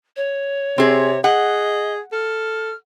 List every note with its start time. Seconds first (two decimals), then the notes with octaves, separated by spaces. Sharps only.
0.16 C#5
0.78 C3 C4 G#4
1.24 G#4 D#5 F#5
2.12 A4 F6